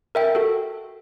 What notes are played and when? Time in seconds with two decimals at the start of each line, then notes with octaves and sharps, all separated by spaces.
0.15 A#4 E5 G5
0.35 F#4 A4